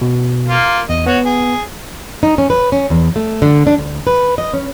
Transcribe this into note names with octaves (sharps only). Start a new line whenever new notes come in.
B2
A#3 F4
E2 D#5
B3 F#4 C#5 F#5
G#4
D#4
C#4
B4
C#4
E2
A3
D3
D4
D2
B4
D#5
C#4